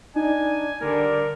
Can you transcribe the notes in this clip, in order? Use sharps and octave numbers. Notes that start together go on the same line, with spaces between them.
D4 D#4 G#5
D3 G3 A#4 D5